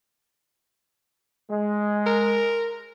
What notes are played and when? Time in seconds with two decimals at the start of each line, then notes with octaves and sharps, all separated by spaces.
1.49 G#3
2.06 A#4